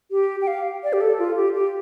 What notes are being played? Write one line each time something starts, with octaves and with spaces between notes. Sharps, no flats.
G4
G5
F5
D5
G4
A4
F4
G4
G4